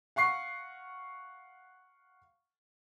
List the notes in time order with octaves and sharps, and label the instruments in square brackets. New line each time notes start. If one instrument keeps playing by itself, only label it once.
[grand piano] F5 F#5 C#6 C7